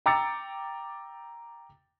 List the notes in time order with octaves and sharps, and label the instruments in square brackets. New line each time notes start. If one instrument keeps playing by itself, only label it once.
[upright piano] G5 A#5 D6 E6 A6 C#7